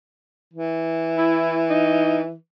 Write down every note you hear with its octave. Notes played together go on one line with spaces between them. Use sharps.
E3
E4
D#4